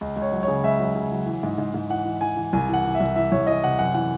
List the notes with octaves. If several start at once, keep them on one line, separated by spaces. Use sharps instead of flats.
C#2
C#2
C#5
F#3
C#5
C#3
C#2 E5
F#3
C#3
F#3
E3
G#2
G#2
G#2
E3 F#5
E3
E3 G#5
E3
C2 G#5
E3 F#5
E3
E5
C2
E3 E5
C2 C#5
E3 D#5
C3 F#5
F#2 F#5
E3 F#5